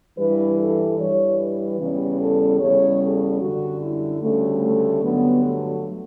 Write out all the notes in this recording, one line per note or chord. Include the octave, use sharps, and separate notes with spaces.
G2 E3 G3 B4
A4
G2 E3 G3 C#5
B4
E2 C#3 G3
A4
E2 C#3 G3 C#5
A4
F#2 D3 G3 F#4
E4
D2 C#3 G3 A3
A3
G2 D3 F#3 B3
A3